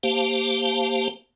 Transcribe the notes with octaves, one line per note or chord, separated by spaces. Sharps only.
A#3 G4 C5 F5 A5